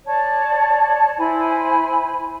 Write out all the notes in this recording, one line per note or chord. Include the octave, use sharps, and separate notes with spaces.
C#5 D5 A5
E4 C5 G#5 B5